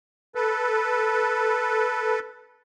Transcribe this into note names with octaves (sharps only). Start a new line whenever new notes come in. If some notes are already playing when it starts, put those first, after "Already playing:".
A4 B4